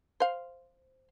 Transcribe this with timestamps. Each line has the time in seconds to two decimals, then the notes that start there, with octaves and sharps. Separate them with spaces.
0.20 C5 F5